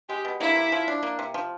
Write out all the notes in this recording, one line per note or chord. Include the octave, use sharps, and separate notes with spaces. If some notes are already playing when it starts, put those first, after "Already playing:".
G#3 G4
B2
A#3 E4
C3
F3
D4
A#3
C3
F3